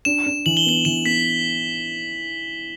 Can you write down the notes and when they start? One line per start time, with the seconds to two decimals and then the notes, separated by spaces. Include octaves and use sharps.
0.05 D4 E7
0.26 D4
0.46 E3 F#7
0.57 G7
0.66 B3 F#7
0.85 E3 E7
1.06 B3 B6